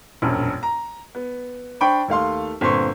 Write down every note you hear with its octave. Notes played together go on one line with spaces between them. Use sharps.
E1 A#1 F#2
A#5
B3
D4 C5 G5 B5 C#6
D#2 A3 F5 C6
G1 A#2 C4 C6 C#6